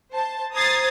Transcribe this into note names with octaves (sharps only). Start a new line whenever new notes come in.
C5 A5
C5 A#5 D#6 G#6 A6 C7